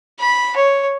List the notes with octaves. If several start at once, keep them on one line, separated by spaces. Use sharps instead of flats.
B5
C#5